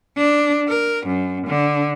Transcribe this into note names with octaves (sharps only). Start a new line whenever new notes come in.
D4
A#4
F#2
D3